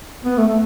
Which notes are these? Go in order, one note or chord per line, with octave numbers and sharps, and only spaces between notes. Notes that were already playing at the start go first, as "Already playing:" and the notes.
B3
A3
A3